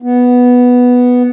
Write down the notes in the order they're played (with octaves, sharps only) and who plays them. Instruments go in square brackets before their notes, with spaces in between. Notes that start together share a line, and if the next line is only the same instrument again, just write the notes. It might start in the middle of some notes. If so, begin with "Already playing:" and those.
[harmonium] B3